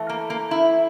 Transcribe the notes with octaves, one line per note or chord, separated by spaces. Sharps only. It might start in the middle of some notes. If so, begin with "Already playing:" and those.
Already playing: E3 A3
A#3
A#3
E4